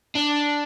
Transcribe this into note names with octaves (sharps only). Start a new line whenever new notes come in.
D4